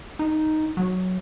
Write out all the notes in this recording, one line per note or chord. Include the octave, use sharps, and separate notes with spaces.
D#4
F#3